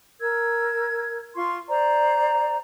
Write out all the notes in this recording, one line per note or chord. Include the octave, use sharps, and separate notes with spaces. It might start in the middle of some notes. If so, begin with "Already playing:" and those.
A#4 E6 G#6
F4 C6 C#6
C5 D5 A#5